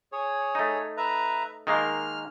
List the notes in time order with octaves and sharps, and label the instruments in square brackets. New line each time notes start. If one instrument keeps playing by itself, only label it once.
[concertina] G#4 C#5
[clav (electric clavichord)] A3 D#4
[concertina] B4 E5 A#5
[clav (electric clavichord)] D#3 G#3 A#3 [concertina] F6